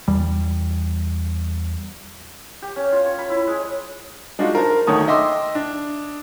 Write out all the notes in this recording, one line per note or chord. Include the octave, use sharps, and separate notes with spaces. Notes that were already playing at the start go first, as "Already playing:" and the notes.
E2 G3
G4
C#4
F4
C#5
B5
E4
G#3
G#3 D4 D#4 F4 F#4
A#4 C5 A5
D2 D#3 C#5 A5 D#6
D#5 E5 G5 C6 D6 E6
D4